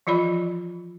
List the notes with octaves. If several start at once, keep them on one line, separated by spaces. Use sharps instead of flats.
E3 F3 F4 D5 B5